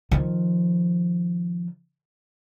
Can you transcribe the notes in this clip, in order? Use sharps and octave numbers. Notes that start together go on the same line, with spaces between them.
D#3 F3